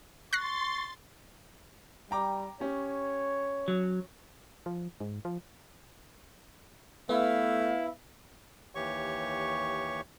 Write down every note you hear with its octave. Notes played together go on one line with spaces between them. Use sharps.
C6 C#6 F#6 A6 A#6 C7
G3 G5 A#5 D6
C#4 G4 C#5
F#3
F3
G#2
F3
A3 B3 E4 F5
D#2 E3 G4 C#5 C#6